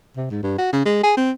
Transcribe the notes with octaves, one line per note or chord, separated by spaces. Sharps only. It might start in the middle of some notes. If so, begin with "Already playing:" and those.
C3
G#2
G2
F#4
C#3
G#3
G#4
C4